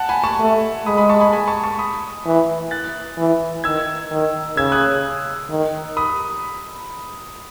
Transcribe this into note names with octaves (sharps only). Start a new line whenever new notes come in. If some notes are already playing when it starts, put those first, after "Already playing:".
Already playing: F#5 A5
G#5 B5
A5 C#6
A3
G#3 B5 D#6
B5 D#6
A5 C#6
G#5 B5
G#5 B5
A5 C#6
A5 C#6
B5 D#6
E3
F#6 A6
E3
D#3 E6 G#6
D#3
C#3 E6 G#6
D#6 F#6
D#3
B5 D#6